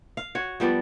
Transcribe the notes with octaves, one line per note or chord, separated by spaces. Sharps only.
F5
F#4 C#5
F3 G3 B3 D5